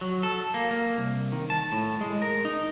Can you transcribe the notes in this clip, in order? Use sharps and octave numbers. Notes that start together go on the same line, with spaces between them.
F#3
A4
A#3
A#3
C2
D#3
A5
A2
G#3
A#4
D#4